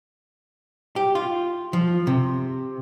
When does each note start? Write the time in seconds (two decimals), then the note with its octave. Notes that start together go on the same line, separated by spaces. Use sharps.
0.96 G4
1.15 F4
1.73 F3
2.07 C3